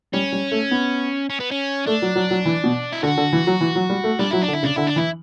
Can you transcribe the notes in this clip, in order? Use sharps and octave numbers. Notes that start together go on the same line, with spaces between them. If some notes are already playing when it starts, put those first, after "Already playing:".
G3 C#4
G3
A3
B3
C#4
B3
C#4
A3 D4
F#3
F#3
F#3
E3
B2
E4
D3 F#4
D3
E3
F#3
E3
F#3
G3
A3
G3 D4
F#3 E4
D4
D3
E4
C#3 D4
D3 E4
D4
E3 E4